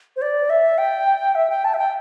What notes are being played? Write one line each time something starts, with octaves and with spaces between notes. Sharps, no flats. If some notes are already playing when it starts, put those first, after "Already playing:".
C5
D5
E5
G5
E5
G5
A5
E5
G5